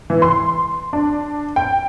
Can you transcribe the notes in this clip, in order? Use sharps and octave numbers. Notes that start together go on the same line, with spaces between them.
E3
C6
D4
G5